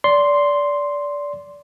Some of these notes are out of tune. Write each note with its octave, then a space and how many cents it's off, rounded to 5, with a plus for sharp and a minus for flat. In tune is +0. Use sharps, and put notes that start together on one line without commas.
D5 -20 C6 +0